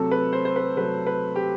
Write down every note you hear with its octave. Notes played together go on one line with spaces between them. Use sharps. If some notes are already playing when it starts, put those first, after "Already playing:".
Already playing: C3 F#3 A3 A4
B4
C5
C5
B4
C3 F#3 A3 B4
B4
G4